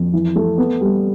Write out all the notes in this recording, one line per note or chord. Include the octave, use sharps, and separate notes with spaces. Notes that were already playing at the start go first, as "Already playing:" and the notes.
Already playing: F2
E3
A3
B3
G3